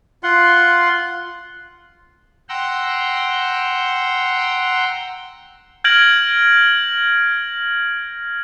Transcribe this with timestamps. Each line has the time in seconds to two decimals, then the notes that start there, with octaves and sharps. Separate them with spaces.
0.23 F4 F#5 C6
2.49 F#5 G5 A#5 C6 E6
5.84 F6 G6 G#6 A#6 D7 F#7